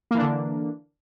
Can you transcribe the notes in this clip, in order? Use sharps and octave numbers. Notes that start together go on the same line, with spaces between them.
D3 E3 A#3 D4